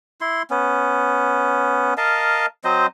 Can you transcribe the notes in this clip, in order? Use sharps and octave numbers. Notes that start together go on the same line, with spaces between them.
E4 C6
B3 C#4
A#4 D#5 F5 A5
F#3 C4 C5 D#5